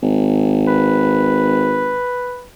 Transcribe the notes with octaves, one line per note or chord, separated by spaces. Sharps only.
G#1
B4